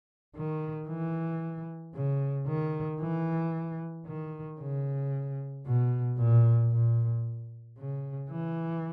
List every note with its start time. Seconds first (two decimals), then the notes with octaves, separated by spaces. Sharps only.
0.36 D#3
0.88 E3
1.95 C#3
2.47 D#3
3.01 E3
4.06 D#3
4.60 C#3
5.66 B2
6.18 A#2
6.71 A#2
7.78 C#3
8.30 E3